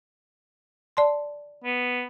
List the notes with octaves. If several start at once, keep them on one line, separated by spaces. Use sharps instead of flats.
D5 A5 C6
B3